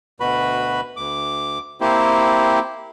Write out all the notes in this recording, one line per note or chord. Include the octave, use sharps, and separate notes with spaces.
D2 B2 F#4 B4 B5
D2 D6
A#3 C4 E4 G4